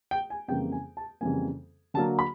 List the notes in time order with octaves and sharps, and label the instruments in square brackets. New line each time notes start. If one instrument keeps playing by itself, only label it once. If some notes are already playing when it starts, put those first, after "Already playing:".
[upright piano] G5
G#5
F2 C#3 E3 G3 A#3 G5
G#5
A5
F2 C#3 E3 G3 A#3 G#5
D3 F#3 A#3 A5
B5